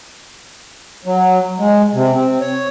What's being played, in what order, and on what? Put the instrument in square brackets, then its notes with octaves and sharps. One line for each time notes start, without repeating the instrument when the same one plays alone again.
[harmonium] F#3
G#3
C3
C4
C#5